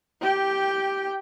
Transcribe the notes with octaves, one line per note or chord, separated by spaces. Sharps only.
G4 G5